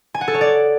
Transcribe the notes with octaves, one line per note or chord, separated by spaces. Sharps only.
G#5
F#5
A4
C#5
D5